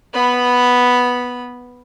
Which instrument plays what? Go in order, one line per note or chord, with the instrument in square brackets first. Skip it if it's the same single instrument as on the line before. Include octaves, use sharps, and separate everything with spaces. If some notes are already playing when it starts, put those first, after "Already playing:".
[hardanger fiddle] B3 B5